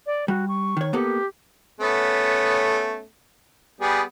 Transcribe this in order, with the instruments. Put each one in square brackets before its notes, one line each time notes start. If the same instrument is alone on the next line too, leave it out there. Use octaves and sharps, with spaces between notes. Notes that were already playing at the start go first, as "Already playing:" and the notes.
[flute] D5
[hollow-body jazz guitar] G3 [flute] F#4
[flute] C#6
[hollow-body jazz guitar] D#3 C#5
[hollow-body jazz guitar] A#3 B3 A4 [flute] G4
[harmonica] A3 B3 C#4
G3 B3 G#4